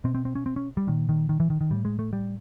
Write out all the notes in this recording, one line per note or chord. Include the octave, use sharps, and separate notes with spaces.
B2 C4
C4
C4
C#4
C4
C#4
G3
A#2 D#3
D#3
D#3
E3
D#3
D#3
A2 G3
G#3
A3
G3